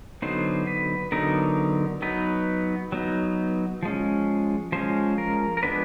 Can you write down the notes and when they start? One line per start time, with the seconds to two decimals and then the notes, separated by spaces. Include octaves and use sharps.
0.22 D3 F#3 B3 D#4 C5
0.67 B4
1.12 D3 F#3 B3 D#4 A#4
2.02 F#3 B3 D#4 B4
2.92 F#3 B3 D#4
3.83 F3 G#3 C#4
4.72 F3 G#3 C#4 C5
5.18 A#4
5.57 A#4
5.63 F3 G#3 B3 D4 B4